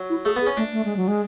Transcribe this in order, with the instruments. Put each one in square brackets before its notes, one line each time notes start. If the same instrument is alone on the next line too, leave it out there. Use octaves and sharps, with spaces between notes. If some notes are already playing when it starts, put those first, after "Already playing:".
Already playing: [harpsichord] F#3
[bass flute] E4
[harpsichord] A3 [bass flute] G#4
[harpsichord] B3
[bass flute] G#4
[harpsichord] C#4
[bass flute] A3 [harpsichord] D4
[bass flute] A3
G#3
F#3
G#3